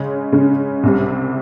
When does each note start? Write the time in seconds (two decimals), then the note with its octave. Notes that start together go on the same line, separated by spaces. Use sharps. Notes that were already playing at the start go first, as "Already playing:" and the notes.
Already playing: C#3 G#3 C#4
0.32 C#3 G#3 C#4
0.83 C2 C3 G3